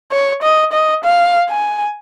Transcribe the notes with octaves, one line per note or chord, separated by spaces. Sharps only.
C#5
D#5
D#5
F5
G#5